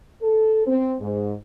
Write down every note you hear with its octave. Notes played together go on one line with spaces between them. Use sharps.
A4
C4
G#2